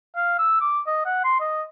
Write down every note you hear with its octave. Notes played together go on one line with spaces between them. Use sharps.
F5
E6
D6
D#5
F#5
C6
D#5